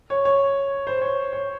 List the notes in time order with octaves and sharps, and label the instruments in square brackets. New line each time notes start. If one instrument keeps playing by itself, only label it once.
[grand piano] C#5
C#5
C5
C#5
C#5